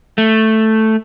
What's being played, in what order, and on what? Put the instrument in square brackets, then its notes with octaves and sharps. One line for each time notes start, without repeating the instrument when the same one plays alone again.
[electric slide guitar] A3